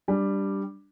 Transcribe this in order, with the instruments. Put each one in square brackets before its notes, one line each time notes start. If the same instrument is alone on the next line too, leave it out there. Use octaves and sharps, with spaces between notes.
[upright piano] G3 D4